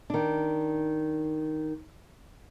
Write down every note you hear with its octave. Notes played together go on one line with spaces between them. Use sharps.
D#3 D4